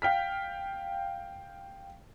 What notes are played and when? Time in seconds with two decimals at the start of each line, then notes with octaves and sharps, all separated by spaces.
0.02 F5 G5 F6 B6